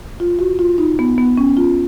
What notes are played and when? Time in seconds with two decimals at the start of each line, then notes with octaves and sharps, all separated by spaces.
0.20 F4
0.39 F#4
0.59 F4
0.78 D#4
0.99 B3
1.18 B3
1.38 C#4
1.57 F4